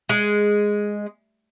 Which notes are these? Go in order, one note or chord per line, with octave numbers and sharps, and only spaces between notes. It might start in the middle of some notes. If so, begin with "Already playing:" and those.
G#3